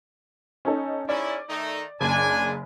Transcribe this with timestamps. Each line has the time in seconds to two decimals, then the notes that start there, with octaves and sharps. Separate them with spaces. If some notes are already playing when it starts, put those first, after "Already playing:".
0.65 C#4 D#4 A4
1.09 G#2 C#4 E4 D5
1.49 D#3 A3 D#4
2.00 F#1 C#3 D4 G#5